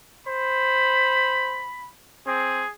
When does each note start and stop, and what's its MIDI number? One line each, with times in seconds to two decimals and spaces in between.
0.27 1.66 72
0.27 1.88 83
2.27 2.65 60
2.27 2.71 68